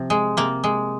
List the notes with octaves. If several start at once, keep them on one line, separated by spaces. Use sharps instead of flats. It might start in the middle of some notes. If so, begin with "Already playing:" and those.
Already playing: C3 F3
G#3
C3 A#3
G#3